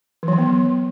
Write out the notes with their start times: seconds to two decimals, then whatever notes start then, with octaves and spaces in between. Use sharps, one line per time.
0.23 E3
0.28 F#3
0.33 E3
0.38 B3